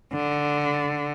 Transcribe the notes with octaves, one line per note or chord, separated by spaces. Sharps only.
D3